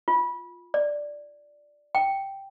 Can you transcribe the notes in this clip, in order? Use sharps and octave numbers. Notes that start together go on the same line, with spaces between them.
F4
D5
G5